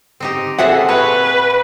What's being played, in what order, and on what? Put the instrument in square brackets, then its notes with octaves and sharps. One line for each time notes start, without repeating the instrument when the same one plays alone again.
[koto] C4 D#4 G4
[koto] A#2 C4 G#4 [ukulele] A4 E5 F#5
[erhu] B4 [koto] C#5